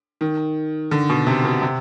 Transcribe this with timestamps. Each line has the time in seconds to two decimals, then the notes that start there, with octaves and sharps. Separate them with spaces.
0.21 D#3
0.91 D3
1.10 B2
1.27 C3
1.45 B2
1.62 C3